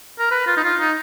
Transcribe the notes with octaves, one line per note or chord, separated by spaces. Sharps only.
A#4
B4
F4
D#4
F4
D#4